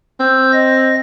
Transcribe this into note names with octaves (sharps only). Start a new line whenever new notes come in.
C4 E6 G6
D#5 A#6